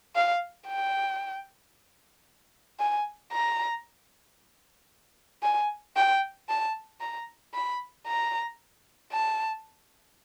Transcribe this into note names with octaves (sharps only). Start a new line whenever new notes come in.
F5
G5
G#5
A#5
G#5
G5
A5
A#5
B5
A#5
A5